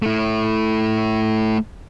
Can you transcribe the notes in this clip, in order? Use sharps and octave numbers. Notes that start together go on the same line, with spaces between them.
A3 E4